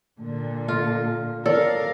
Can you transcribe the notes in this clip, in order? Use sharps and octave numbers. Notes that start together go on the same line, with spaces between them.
A#2 D3
F4
A4 A#4 D5 F5